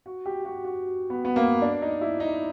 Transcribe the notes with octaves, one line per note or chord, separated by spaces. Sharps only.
F#4
G4
F#4
F#4
B3
B3
A#3
D4
D#4
E4
D#4